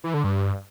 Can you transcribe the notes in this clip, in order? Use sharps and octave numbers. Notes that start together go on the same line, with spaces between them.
E3
D3
G2